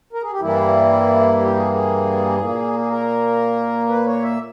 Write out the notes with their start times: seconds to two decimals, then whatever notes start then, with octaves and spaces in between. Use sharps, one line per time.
0.13 A#4
0.22 G#4
0.31 G4
0.40 G2 E3 G3 A#3 E4
1.40 G4
1.56 G#4
1.73 G#4
2.40 A#2 A#3
2.79 G#4
2.90 A#4
3.89 B4
4.06 C#5
4.22 E5